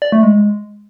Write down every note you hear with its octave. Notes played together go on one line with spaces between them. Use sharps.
D5
A3
G#3